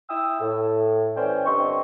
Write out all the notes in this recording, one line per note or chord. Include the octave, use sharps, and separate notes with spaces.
E4 E5 G5 D#6 E6
A2
E3 C#4 C5 D5 G5
G2 D3 C4 D#5 C6 C#6